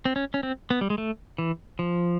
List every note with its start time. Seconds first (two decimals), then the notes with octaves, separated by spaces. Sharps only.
0.05 C4
0.16 C#4
0.34 C#4
0.43 C4
0.70 B3
0.81 G3
0.90 G#3
0.98 A3
1.38 E3
1.79 F3